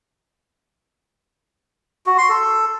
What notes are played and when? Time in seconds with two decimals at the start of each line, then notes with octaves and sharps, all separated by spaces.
2.06 F#4
2.18 C6
2.29 A4